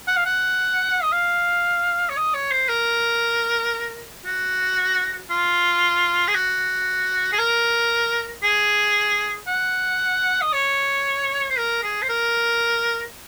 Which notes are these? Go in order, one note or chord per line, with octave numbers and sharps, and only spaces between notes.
F#5
F5
F#5
D#5
F5
C#5
D#5
C#5
C5
A#4
F#4
F4
G#4
F#4
G#4
A#4
G#4
F#5
D#5
C#5
C5
A#4
G#4
C5
A#4